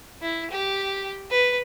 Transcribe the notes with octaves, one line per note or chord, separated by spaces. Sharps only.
E4
G4
B4